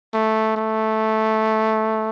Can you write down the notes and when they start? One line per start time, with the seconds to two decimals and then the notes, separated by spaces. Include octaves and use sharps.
0.14 A3
0.57 A3